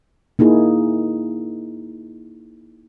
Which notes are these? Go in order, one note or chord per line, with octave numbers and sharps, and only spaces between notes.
A#3 D#4 E4 G#4